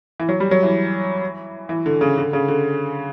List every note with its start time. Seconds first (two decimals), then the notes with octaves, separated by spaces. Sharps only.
0.20 E3
0.29 F#3
0.40 G3
0.51 F#3
0.63 E3
1.69 E3
1.86 D3
2.01 C#3
2.18 D3
2.33 C#3
2.48 D3